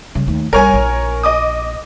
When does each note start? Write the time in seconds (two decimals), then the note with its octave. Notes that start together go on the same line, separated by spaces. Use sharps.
0.15 C#3 G3
0.27 D#2 A3
0.53 A#1 G3 A#4 C#5 G#5
0.74 A#1
1.23 D#5 D6 D#6